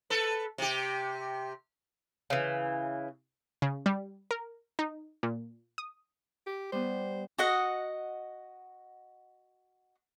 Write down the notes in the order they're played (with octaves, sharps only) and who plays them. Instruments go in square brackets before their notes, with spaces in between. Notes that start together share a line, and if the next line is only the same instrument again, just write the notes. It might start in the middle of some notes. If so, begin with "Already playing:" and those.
[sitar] A4 B4
C3 G4
[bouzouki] C#3 E3
[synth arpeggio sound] C#3
G3
A#4
D#4
A#2
D#6
[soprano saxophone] G4
[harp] G3 B3 [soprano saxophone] C5
[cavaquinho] F#4 D#5 F#5